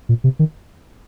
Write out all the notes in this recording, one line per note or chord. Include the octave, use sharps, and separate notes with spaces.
A#2
C3
D#3